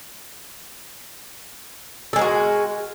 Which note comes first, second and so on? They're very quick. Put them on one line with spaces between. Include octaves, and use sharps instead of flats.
A4 G#3 A#4 F#4